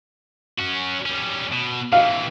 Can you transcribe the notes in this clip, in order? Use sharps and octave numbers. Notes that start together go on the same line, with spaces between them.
C#4 F#4
G3 C#4
B2
C3 E3 F5